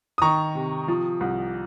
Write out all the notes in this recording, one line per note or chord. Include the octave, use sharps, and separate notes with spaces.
D#6
D#3 A#5 C#6
C3
F3
C2